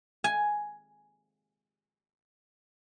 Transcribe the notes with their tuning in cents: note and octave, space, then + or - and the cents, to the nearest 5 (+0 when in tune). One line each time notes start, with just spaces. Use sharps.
G#5 +5